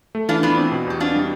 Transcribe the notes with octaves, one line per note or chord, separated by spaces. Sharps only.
A3
E3 D4 F4
B3 D4 F4
C4
B2
E2 G4
C4 D4 F4
G3